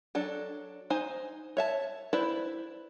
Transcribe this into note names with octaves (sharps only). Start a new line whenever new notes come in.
F#3 D4 A4
D#4 C5 G#5
C#5 E5 A5
E4 B4 C5 D5